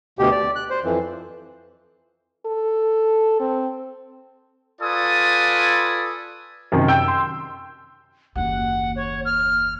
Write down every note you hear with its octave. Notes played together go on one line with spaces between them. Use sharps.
D2 B2 G4
D5
F#6
C5
F2 E3
A4
C4
F4 A4 B4 D5 G#5 D#6
F#2 C3 D#3
G5 E6 G6
C6
F#1 D#2 F#5
C#5
F6